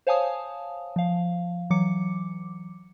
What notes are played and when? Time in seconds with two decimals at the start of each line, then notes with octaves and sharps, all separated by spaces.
0.07 C5 C#5 F5 G#5 A5 D#6
0.96 F3 F5
1.70 E3 F#3 D6 C#7